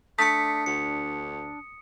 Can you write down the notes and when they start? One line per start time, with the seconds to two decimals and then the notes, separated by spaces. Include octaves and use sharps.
0.19 A3 D4 D#6 B6 C#7
0.66 D2 C#7